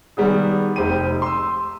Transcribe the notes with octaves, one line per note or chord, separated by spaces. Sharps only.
D#3 G3 B3 G#4
F1 D#4 G4 C5 G5 D#7
C6 E6